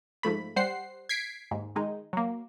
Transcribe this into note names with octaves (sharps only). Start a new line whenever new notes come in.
G#2 F3 A3 B5
G3 C5 F#5 C7
G#6 B6 C7 D7
D#2 G#2
D#3 G#3 D#4
F#3 A#3